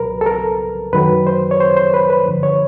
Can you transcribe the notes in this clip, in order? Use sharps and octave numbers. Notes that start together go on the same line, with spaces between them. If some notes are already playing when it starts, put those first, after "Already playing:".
Already playing: C2 B2 F#3 A#4 B4
A4
A#4
F#2 D#3 F#3 B4
C5
C#5
C5
C5
B4
B4
G2 D3 F3
C#5